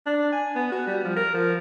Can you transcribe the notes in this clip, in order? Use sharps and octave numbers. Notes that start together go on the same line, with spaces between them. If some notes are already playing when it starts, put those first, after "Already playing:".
D4
G#5
B3
F#4
G3
F3
A#4
F3